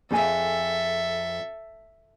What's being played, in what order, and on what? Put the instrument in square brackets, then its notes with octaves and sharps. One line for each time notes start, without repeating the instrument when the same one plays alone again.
[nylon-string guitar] F2 G#4 G#5 [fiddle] A4 E5